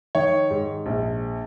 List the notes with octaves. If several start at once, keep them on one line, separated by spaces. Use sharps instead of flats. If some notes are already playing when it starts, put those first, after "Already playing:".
D#3 C#5
G#2
A#1